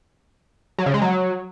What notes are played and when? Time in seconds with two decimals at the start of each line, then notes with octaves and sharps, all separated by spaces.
0.78 F#3
0.86 C#3
0.94 G#3
1.02 F#3